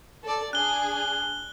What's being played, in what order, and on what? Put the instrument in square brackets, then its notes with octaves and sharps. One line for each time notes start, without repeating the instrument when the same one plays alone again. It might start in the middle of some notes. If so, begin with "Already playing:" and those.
[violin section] A4 D5
[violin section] D4 G#4 [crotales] F#6 G7